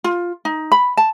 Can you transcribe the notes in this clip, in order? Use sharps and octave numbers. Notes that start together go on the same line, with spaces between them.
F4
D#4
B5
A5